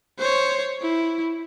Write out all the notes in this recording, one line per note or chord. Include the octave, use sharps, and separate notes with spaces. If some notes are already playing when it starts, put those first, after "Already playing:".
C5 C#5
E4